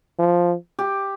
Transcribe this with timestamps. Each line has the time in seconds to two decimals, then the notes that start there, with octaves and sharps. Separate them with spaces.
0.19 F3
0.79 G4